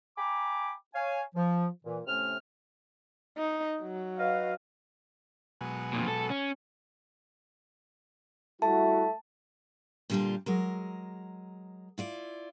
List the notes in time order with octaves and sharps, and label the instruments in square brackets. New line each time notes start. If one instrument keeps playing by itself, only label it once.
[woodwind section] G5 G#5 A#5 B5 D6
C#5 F5 G#5
F3
A#2 E3
A2 C3 A3 C#4 F6
[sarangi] D#4
F#3
[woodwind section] B4 D#5 F5
[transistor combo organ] B2 F#3 G#3
[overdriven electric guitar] F2 A#2
A4
C#4
[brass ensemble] G3 E4 F#4 [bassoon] A3 [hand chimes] A5
[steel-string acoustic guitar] A#2 D3 G3 B3 D4 F4
F#3 G#3 A#4
E4 F4 D5